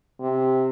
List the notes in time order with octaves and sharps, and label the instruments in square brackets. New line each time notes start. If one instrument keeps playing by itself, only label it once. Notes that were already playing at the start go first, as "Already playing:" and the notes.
[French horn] C3